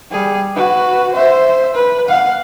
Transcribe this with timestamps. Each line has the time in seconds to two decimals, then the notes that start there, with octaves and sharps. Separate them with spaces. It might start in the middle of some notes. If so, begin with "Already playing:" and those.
0.11 G3 G#4
0.56 F#4 B4
1.13 C5 E5
1.75 B4
2.08 F5 F#5